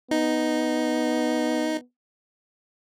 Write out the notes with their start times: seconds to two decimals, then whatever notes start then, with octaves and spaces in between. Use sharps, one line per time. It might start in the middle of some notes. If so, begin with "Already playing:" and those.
0.11 B3 D#4